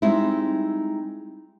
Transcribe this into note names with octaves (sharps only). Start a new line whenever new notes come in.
G3 G#3 C4 D#4 E4